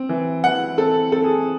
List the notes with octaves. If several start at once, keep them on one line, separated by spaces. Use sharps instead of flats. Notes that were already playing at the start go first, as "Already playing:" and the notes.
Already playing: C4
E3
E3 F#5
C4 A4
C4 A4
G#4